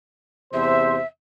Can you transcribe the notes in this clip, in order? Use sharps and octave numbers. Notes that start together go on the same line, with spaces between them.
E2 C3 C5 E5